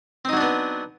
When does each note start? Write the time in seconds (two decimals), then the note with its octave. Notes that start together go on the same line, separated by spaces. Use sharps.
0.25 C4
0.29 D#4
0.33 F#3
0.37 D4
0.41 B3